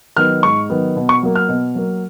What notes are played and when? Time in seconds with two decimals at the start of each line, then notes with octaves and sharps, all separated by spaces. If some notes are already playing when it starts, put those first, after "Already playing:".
0.17 D#3 F#3 B3 F6
0.43 G#2 C#6
0.70 D#3 F#3 B3
0.96 B2
1.09 C#6
1.23 F#3 A#3
1.35 F6
1.49 B2
1.75 F#3 A#3